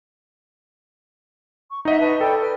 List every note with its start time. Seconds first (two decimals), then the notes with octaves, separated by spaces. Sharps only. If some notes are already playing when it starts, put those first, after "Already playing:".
1.68 C#6
1.85 D#4 D#5 E5 F#5
2.01 B4 A5 C#6
2.21 A4 D5 G5 B5
2.40 B4 F6